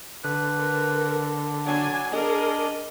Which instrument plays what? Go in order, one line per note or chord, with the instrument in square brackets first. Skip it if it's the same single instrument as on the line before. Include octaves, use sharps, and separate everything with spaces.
[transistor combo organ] D3 [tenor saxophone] B4
[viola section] A4 A#4
[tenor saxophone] F#3 [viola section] D4 G#5
[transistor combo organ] D4 [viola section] G#4 A#4 [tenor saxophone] D#5